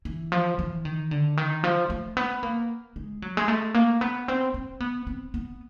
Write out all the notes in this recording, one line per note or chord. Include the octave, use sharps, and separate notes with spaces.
E3
F3
E3
D#3
D3
D#3
F3
A3
B3
A#3
G#3
F#3
G#3
A3
A#3
B3
C4
C4
B3
C4
B3